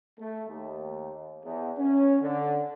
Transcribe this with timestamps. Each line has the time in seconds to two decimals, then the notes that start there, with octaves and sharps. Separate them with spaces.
0.20 A3
0.49 D#2
1.45 E2
1.79 C#4
2.21 D3